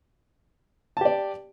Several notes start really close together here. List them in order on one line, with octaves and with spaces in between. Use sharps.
A5 G4 D5